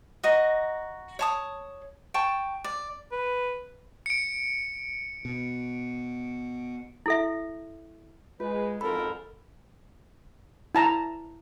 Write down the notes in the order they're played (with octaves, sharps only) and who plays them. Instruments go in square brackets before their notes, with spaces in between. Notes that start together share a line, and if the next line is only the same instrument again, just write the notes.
[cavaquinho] F#4 D#5 A#5
C#5 A5 D#6
G5 A5 C#6
D5
[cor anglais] B4
[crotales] C#7 D7
[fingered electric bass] B2
[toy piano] E4 A4 E5
[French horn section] G#3 [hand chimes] F4 G#4 [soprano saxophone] B4
[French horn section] F2 G#2 [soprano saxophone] F4 [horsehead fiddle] A4 A#4 [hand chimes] B5
[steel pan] E4 A5 A#5